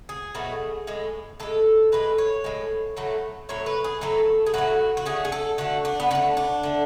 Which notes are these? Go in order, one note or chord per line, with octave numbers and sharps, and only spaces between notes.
G#4
B2 F#3 A3
A2 G#3
A2 G#3 A4
A2 G#3 B4
C#5
A2 G#3
A2 F#3 A3
A2 F#3 A3 C#5
B4
G#4
A2 F#3 A3 A4
G#4
A2 F#3 A3 F#4
F#4
D3 A3 G#4
G#4
A4
D3 A3 F#4
D4
B3
D3 A3 C#4
D4
D3 A3